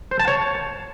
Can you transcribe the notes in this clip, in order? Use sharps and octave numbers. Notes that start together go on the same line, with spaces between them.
C5
A5
C#5